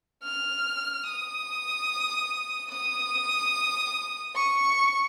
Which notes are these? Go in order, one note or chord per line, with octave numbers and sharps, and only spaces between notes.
F6
D#6
D#6
C#6